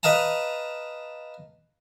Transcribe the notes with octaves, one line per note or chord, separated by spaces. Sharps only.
B4 D#5 F5 A5 A#5